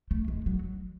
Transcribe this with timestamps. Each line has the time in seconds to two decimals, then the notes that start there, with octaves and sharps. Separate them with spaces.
0.11 A3
0.28 G#3
0.46 F#3